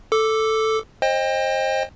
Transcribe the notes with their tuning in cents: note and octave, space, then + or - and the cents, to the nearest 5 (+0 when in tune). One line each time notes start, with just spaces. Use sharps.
A4 +0 D6 +0
C5 +25 D#5 +0 G5 +30